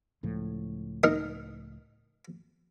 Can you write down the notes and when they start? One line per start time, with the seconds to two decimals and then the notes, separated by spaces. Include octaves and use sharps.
0.23 C#2 A2 F3
1.04 D#4 A#4